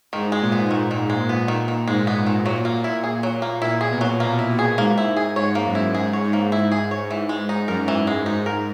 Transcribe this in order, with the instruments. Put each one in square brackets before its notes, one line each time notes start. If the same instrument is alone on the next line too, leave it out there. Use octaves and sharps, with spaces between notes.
[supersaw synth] G#2 [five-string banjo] D#3
[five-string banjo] G#3
[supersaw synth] A#2
[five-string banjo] B3
D#3
D#3
G#3
B3
D#3
D#3
[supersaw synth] G#2 [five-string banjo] G#3
[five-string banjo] B3
D#3
[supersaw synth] A#2 [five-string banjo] F#3
[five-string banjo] A#3
[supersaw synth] A#2
[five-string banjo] E4
G#4
F#3
A#3
[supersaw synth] A#2 [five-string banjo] E4
[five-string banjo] G#4
[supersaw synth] B2
[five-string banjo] F#3
[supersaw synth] B2 [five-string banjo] A#3
[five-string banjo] E4
[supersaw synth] A#2
[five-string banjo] G#4
[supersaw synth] G#2 [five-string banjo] A#3
[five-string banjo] E4
G#4
[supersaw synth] G#2 [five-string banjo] C#5
[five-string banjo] A#3
[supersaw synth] F#2
[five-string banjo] E4
[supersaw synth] G#2 [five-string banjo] G#4
[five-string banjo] C#5
[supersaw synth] G#2
[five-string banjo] A#3
[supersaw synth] G#2 [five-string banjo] E4
[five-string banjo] G#4
C#5
E3
G#3
D#4
[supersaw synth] F#2 [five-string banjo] A#4
[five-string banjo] E3
G#3
[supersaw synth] G#2 [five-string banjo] D#4
[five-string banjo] A#4